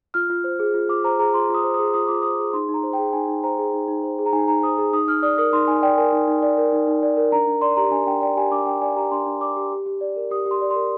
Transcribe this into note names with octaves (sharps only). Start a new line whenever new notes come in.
F4 F6
F4
C5
G#4
F4
F4 D6
C5 A#5
G#4 A#5
F4 C6
F4 D#6
C5
D#6
G#4
F4 D#6
F4 D6
C5 D#6
G#4
D#4 C6
D#4
A#5
C5
G5
G#4
D#4 G#5
D#4
C5 A#5
G#4
D#4
D#4
C5
G#4
A#5
D#4 G#5
D#4 A#5
C5 D#6
G#4
D#4 D#6
D#4 F6
D5 D#6
A#4 D#6
D#4 C6
D#4 G#5
D5 G5
A#4 G#5
D#4
D#4
D5
A#4
D#4
D#4
D5
A#4
D4 A#5
D4
D5 C6
G4 A#5
D4 G#5
D4 G5
D5 G5
G4 G#5
D4 D6
D4 G5
D5 G#5
G4 A#5
D4 C6
D4
D5 D6
G4
G4
G4
D5
A#4
G4 D#6
G4
C6
D5
C6
A#4